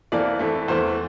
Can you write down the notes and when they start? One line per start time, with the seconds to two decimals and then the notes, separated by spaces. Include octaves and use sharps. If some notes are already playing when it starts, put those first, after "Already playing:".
0.12 F2 E3 A#3 D5
0.39 F2 E3 A3
0.68 E2 E3 A3 C5